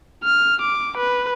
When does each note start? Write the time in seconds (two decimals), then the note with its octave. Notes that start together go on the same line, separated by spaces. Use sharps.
0.24 F6
0.62 D6
0.98 B4